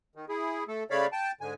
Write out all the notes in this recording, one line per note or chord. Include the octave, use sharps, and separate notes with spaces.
D#3
E4 G#4
A3 A4
C#3 A3 C#5 D5 F5 B5
G5 A5
G#2 D3 G#5